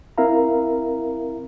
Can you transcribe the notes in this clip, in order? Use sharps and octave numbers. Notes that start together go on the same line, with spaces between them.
C4 E4 A#4 E5 F5 A#5